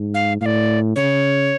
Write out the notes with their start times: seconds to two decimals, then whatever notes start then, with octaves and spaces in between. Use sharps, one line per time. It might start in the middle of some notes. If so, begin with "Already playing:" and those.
Already playing: G#2
0.14 F5
0.41 A2 F5
0.46 D5
0.96 C#3 C#5